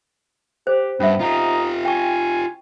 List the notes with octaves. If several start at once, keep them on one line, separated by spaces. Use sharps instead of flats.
G4 C5
G2 B3 C#4 E5
D#4 F4 G4
G5 G#5 C#6